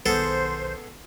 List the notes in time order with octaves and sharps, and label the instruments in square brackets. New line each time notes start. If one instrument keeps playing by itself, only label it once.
[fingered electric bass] B1 D#3 [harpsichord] B3 G#4 A4 [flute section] C5